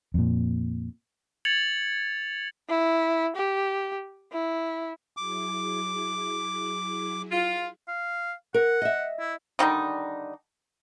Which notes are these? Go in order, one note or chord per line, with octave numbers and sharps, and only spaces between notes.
F2 A#2
G#6 A6 C#7 F7 F#7
E4
G4
E4
F#3 E4 G#4 D6
F4
F5
A#4 F#5
D#5 E5
E4
D3 D#3 G3 D#4